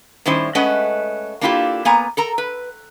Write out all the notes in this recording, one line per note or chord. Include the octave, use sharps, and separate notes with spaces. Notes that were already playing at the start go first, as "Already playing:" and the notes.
A2 D#3 G3 C#4 E4 C5
G#3 A3 C#4 B4 D#5 F#5
A#3 D4 E4 F4 G4 A4
A#3 B3 G#5 A#5
A4 A#4 A#5
B4